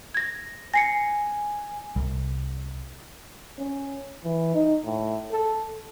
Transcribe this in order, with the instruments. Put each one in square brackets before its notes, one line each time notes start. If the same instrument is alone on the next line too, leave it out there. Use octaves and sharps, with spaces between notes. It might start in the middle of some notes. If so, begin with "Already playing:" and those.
[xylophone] G#6 A#6
[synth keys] G#5 [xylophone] A#6 C7 C#7
[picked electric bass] C2
[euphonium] C#4
E3
D#4
A2
A4